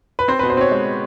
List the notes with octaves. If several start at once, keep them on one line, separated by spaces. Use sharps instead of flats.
B4
C4 C5
B2 B4
C5
C4 C#5
G#3